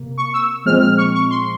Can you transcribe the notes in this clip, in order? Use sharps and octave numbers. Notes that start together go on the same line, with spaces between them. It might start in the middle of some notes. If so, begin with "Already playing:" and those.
Already playing: C3 A#3
C#6
E6
A#2 F3 G#3 C4 F6
F6
C#6
C#6
C6